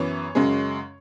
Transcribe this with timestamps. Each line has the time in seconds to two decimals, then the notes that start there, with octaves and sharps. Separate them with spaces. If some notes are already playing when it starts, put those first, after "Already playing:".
Already playing: F#2 E3 B3 C#5
0.35 F#2 C#3 G#3